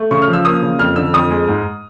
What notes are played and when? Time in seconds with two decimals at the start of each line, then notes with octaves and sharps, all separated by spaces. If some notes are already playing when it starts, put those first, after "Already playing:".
Already playing: A3
0.11 C#3 C#6
0.22 F6
0.28 F3
0.33 E6
0.45 A#3 D#6
0.62 C#3
0.79 F2 F6
0.96 D3 E6
1.13 F2 D#6
1.30 G#3
1.48 G#2